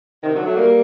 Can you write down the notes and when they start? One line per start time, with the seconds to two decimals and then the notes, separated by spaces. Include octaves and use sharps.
0.23 C3 D#3
0.34 D3 F#3
0.45 F#3 A3
0.56 G3 A#3